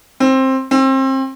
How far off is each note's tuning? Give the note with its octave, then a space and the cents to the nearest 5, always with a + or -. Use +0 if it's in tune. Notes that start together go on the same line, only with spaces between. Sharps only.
C4 +15
C4 +30